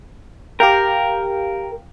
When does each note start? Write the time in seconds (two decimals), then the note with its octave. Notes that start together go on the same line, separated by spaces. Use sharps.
0.60 G4 A#4 F5 G5